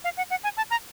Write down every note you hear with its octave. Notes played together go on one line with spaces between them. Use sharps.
F5
F#5
F#5
G#5
A5
A#5